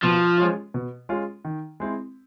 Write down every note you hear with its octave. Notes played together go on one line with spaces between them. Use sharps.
B2 F3
G#3 C#4 F4
B2
G#3 C#4 F4
D#3
G#3 C4 E4